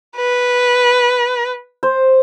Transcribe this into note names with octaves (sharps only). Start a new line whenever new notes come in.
B4
C5